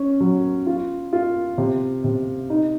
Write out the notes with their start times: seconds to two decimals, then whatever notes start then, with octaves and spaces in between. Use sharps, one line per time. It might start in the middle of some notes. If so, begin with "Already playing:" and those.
Already playing: C#4
0.20 F#3
0.67 F4
1.13 F4
1.58 C3
2.04 C3
2.50 D#4